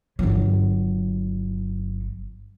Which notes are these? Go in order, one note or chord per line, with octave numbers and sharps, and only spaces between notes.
G1 F#3